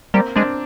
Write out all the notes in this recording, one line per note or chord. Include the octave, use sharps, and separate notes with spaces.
G3 A#3 C4
G#3 C4 D4